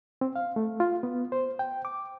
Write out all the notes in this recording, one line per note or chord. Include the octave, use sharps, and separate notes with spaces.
C4
F5
A3
F4
B3
C5
G5
D6